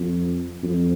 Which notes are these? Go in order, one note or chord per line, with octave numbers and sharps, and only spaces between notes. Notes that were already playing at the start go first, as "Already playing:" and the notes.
Already playing: F2
F2